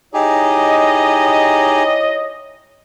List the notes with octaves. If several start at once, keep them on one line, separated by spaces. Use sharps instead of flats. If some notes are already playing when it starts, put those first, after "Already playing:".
D#4 E4 G4 G#4 C#5 D#5